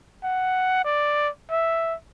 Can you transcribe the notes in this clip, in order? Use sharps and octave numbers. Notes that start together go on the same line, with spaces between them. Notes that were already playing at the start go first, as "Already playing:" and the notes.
F#5
D5
E5